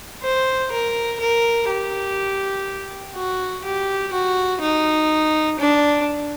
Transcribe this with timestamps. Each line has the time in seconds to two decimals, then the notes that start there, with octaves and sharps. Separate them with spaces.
0.23 C5
0.72 A#4
1.20 A#4
1.69 G4
3.15 F#4
3.64 G4
4.13 F#4
4.61 D#4
5.59 D4